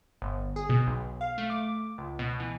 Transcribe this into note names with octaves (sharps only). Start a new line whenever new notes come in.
G1
G#4
B2
B1
F5
A3
D6
C#2
B2
E3